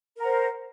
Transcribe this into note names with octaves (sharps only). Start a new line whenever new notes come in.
A#4 C5 F#5